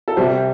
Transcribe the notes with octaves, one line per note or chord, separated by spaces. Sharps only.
A4
C2 C3 G3 C5